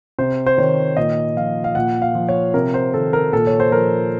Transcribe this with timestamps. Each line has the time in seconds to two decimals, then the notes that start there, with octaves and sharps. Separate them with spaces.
0.19 C3 C5
0.46 C5
0.58 D#3 C#5
0.97 A#2 D#5
1.36 F3 F5
1.64 F5
1.75 A#2 F#5
2.02 F5
2.15 F3
2.29 C#5
2.54 C3 A#4
2.74 C5
2.94 D#3 A4
3.13 A#4
3.33 A#2 A4
3.47 C#5
3.60 C5
3.72 F3 A#4